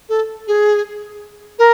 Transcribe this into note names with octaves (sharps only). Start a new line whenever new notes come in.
A4
G#4
A#4